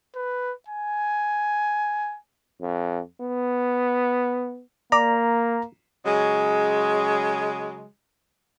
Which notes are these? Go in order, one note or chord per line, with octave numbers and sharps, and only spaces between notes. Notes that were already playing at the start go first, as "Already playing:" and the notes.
B4
G#5
F2
B3
A#3 D5 A#5
C#3 F#3 G#3